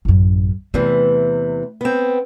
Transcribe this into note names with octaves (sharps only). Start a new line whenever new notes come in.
A1 F#2
E2 C3 E3 A3
B3 C4